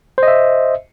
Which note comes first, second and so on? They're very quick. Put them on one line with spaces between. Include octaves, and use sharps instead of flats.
C5 D#5 E5